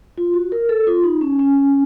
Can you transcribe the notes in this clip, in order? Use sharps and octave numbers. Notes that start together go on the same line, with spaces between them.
F4
F#4
A#4
A4
F4
D#4
C#4
C#4